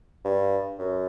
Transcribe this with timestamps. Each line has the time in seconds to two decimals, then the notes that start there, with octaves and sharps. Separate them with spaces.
0.25 G2
0.79 F#2